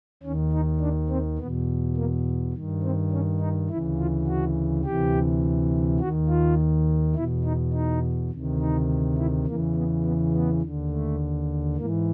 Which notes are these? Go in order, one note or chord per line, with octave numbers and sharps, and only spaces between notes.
D#2 D#3 C#4
D#4
D4
C4
E2 B2 B3
A#3
G2 D#3
C4
C#4
D#4
D2 C#3 E3 E4
F4
F#4
D2 C3 E3 G4
D#2 D#3 F#4
F4
E2 B2 E4
D#4
D#4
D2 C3 D#3
D#4
E4
E2 C#3 E3 A#3
B3
B3
B3
D#2 D3
A3
G#2 E3 A#3